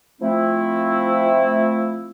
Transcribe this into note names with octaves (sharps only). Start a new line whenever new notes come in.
F3 A3 C4 E4